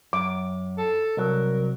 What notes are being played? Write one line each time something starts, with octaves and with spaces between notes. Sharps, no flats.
F#2 D6
A4
C2 F#3 A#4